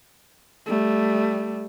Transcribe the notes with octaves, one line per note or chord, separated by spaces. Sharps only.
G3 A3